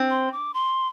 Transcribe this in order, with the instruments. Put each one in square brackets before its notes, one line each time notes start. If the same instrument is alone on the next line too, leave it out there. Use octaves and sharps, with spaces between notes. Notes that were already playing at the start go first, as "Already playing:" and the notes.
Already playing: [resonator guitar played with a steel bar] C4
[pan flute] C6
D6
C6